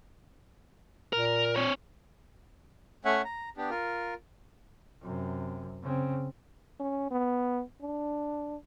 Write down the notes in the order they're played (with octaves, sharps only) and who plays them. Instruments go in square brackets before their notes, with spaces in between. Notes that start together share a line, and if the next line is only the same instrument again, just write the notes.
[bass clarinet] A#2 [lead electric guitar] A#4
[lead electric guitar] C4 C#5
[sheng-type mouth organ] A3 C#4 C#5 E5 F#5 G#5
A#5
B3 D4 G4
F4 A#4
[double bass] F#2 C3
C#3 C4
[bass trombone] C#4
B3
D4